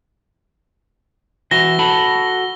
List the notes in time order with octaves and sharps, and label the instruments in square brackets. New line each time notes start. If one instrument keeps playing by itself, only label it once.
[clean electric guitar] E3 F#4 E5 [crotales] A#6 G7
[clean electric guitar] F#4 A4 B5